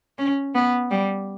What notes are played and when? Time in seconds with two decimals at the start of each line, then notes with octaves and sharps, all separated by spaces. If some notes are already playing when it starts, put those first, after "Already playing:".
0.18 C#4
0.55 B3
0.91 G3